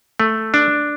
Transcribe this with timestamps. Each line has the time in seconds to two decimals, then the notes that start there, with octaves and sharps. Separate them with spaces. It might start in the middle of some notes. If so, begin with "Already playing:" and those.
0.20 A3
0.54 D4